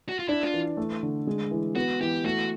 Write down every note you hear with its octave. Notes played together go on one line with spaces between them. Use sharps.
F#4
F4
D4 E4
F4
E3
A3
D3
G#3
E3
B3 F#4
E3 G4
A3 F#4